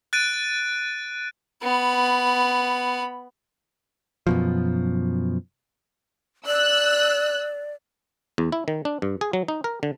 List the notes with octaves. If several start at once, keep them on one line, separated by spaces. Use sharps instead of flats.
F#6 A6 D7 D#7
B3 B5
F#2 B2 F3
D5 E6 F#6
E2
E4
D#3
D4
G2
G#4
F#3
D#4
A#4
D3